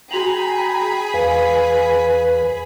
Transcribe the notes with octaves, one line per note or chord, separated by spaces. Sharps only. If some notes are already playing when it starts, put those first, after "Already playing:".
F#4 G#4 G5 A#5 B5 F7 F#7
E2 B4 F5